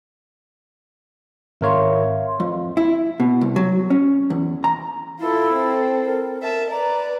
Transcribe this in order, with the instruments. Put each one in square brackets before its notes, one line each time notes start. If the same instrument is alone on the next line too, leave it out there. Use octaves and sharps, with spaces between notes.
[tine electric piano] G#1 A#4 C#5 [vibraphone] E5 F5 C6
[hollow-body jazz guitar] F2
E4
B2
C2
F#3
C#4
E2
A#5
[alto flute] E4 [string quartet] F4 A4
[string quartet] C4 A4
[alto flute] A#4
[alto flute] A#4 [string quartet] E5 A5
[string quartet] B4 D5 [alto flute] A#5